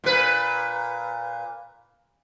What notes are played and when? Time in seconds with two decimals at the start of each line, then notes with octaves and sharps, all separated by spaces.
0.04 A#2 B4